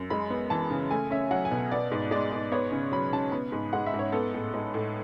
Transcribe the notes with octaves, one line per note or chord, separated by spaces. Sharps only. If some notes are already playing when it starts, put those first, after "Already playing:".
Already playing: F#2
G#3 B5
B3
E3 A5
C#3
A3 G#5
C#4 E5
F#3 F#5
G#5
B2
G#5
B3 D5
G#2
G#3 D5
G#2
B3 C#5
C#3
F#3 B5
C#3 A5
B3 B5
G#2
G#3 F#5
E5
G#2
C#5
B3 A4
A2
G#3
A2